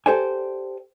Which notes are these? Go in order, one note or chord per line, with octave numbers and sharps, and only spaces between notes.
G4 A4 C5 D5 G#5